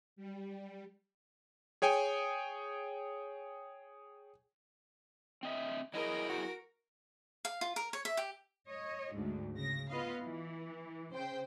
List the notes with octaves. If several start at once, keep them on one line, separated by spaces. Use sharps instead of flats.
G3
G#4 C#5 G5 G#5
C4 D#5 E5
F#3 E4 G#4 A#4 D#5
F#4
F5
F4
A#4
C#5
E5
G4
C#5 D#5
D2 G#2
C#3 A#6
B3 F4 B4 D#5 F5
E3
C#3 C5 G5